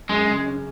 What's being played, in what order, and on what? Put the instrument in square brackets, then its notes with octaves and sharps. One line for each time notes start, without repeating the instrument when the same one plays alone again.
[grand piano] F#2 [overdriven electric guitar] G#3
[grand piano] C#3
C#4